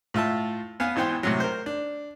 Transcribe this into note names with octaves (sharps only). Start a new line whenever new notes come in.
A2 F4 E5 A5
B3 F5 G#5
G#1 E3 B3 C5 G5 C6
A2 C3 F#3
A#4 C5
D4